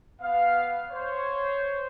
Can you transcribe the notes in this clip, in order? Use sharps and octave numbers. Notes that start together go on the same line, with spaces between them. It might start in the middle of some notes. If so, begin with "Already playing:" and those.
B3 F5
C5 C#5